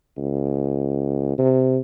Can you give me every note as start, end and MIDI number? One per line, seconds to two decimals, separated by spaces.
0.17 1.34 37
1.38 1.79 48